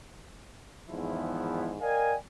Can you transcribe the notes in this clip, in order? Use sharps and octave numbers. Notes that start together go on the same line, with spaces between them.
E2 G#2 D#3 F3 B3 E4
A#4 D5 D#5 F5 G5 G#5